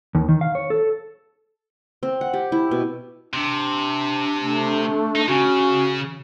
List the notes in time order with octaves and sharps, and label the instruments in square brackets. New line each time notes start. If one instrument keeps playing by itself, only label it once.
[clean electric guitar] D#2
D#3
F5
C#5
A4
[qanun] C4
F#5
G4
E4
B2
[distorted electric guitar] C3 [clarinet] D4
[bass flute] A3
[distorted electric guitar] D#4
[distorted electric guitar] C#3 [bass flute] C#4 [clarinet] F#4